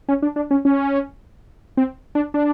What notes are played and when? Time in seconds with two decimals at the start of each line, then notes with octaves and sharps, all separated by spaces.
0.09 C#4
0.22 D4
0.36 D4
0.51 C#4
0.65 C#4
1.77 C4
2.15 D4
2.34 D4